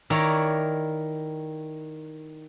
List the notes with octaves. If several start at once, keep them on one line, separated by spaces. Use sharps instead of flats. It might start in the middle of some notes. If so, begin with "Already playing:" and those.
D#3 E4 A#4 C#5 D5